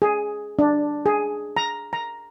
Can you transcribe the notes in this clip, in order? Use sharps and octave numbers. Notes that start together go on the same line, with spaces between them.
G#4
D4
G#4
A#5
A#5